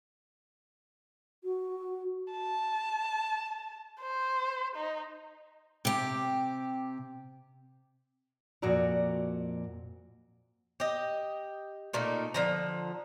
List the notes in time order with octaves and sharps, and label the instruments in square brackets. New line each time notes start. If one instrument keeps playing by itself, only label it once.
[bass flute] F#4
[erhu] A5
C5
D#4
[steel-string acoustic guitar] C3 G4
F2 A#2 F#4 D5 A#5
[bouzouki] G4 D#5
A#2 A3 A#3 D#4
D3 F3 A#5